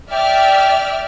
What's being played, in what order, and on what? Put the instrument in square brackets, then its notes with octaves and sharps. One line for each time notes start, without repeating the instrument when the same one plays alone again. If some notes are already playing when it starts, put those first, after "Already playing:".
[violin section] D5 E5 F6 [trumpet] G5